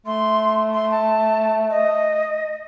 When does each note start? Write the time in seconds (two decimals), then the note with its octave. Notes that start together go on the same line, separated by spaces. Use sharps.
0.06 A3 C6
0.74 C6
0.90 A5
1.70 D#5